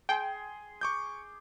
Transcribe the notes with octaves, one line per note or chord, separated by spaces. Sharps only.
G#4 G5 C6
C#6 D6 G6